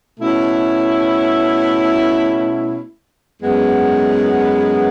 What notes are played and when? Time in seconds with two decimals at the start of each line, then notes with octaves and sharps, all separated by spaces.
0.20 B2 A3 C#4 E4
3.42 F#2 E3 G#3 B3